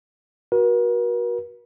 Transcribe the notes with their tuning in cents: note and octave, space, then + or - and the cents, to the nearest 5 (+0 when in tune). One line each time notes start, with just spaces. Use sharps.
F#4 +0 A#4 +45